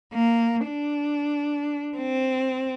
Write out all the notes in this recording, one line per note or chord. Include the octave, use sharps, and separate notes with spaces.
A#3
D4
C4